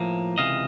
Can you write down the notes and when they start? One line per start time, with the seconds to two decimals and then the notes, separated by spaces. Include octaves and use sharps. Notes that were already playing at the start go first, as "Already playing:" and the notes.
Already playing: A2 F3 A#3
0.38 C#2 C3 E3 D#5 F5